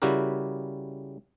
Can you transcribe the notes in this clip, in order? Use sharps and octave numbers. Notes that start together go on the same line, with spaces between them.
C#3 G3 E4 F#4 G4 A#4